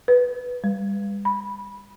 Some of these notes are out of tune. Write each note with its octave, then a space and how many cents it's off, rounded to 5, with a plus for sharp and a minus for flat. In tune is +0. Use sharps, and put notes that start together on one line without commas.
B4 +0
G3 +45
B5 -15